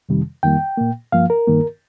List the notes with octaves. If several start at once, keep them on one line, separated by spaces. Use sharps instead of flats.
F2 C3 D#3 G3
F2 D#3 G3 A#3 G5
A#2 A#3
G2 F3 A#3 F5
A#4
G2 D#3 A#3